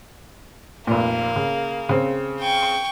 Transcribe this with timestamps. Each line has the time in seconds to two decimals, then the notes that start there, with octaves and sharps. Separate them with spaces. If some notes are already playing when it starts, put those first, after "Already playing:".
0.87 F1 A#2 A#3
1.36 C#3
1.89 C#3 C4
2.41 G5 C#6